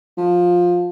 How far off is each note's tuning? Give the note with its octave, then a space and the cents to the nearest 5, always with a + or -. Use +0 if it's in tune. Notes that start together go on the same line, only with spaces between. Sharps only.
F3 +15